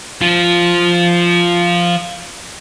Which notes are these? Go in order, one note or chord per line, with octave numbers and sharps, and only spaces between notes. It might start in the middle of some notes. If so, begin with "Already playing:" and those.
F3 F4